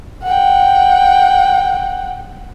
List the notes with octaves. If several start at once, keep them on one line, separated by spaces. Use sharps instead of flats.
F#5 G5